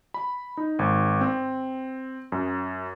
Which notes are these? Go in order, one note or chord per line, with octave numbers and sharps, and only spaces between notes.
B5
D#4
G#1
C4
F#2